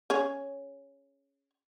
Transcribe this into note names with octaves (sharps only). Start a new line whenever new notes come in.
C#4 G#4 C#5